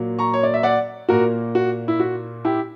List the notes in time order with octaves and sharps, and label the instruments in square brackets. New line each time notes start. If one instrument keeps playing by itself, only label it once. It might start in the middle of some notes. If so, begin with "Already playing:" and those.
Already playing: [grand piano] A#2 F#3 A#3
A#5 C#6
C#5
D5
E5
D5 F#5
A#2 A#3 F#4 A#4
F#4
E4
F#4
E4 G4